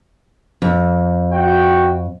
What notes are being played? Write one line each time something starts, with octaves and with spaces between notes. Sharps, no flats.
F2
F#4 G5